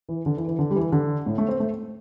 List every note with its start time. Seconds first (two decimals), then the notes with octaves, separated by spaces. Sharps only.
0.09 E3
0.26 D3
0.37 E3
0.47 E3
0.59 D3
0.71 G3
0.76 E3
0.92 D3
1.26 A2
1.38 A3
1.48 C4
1.60 A3